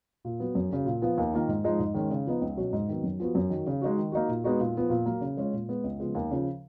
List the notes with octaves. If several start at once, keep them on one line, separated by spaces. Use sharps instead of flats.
A#2
F#3 B3
F#2
C#3 F#3
A#2
F3 B3 F4
D#2
D#3 A#3 F4
G#2
F3 G#3 D#4
G#2
D#3 G#3 C#4
C#3
F3 B3 D#4
C#2
B2 F#3 C#4 F#4
G#2
D#3 F#3 B3
F#2
F3 B3 F#4
F#2
D#3 F#3
C#3
G#3 D#4 F#4
D#3
A#3 D#4 F#4
A#2
G#3 B3 D#4 F#4
A#2
F3 B3 F4
A#2
F#3 A#3
C#3
G#3 C#4 F4
A#2
G#3 B3
C#2
C#3 F3 G#3 B3
D#2
C#3 F3